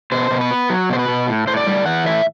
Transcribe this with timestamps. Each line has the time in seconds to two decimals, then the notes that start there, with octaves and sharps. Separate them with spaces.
0.12 B2 C5
0.31 B2
0.41 B4
0.51 B3
0.70 F#3
0.90 B2 C5
0.99 B4
1.08 B2
1.28 A2
1.47 A2 C5
1.57 D5
1.67 G3
1.86 E3 F#5
2.06 A2 E5